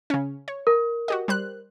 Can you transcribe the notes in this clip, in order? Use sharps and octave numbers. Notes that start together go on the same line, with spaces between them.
C#3 C#4
C#5
A#4
F#4 G4 D#5
G3 C5 F#6